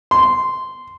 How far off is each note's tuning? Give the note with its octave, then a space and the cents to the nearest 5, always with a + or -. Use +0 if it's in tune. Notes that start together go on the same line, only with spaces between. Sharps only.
C6 -10